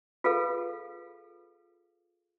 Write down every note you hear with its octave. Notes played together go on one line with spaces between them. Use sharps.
F4 G#4 A4 B4 F5